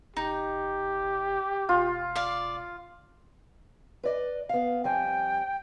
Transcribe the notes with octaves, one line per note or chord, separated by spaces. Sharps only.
F1 D#4 G4
E1 F4
D5 F5
B4 D5 D#5
B3 F5
F2 G3 G5 G#5